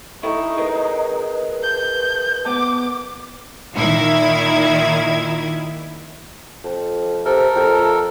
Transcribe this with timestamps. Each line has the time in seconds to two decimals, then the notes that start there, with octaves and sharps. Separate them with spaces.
0.23 D#4 E4 A4 C#6
0.57 G#4 A#4 B4 D#5
1.63 G6
2.46 B3 D6
3.74 A#2 D#3 E4 G#6
6.64 F2
7.25 C3 A4 A#4
7.56 F2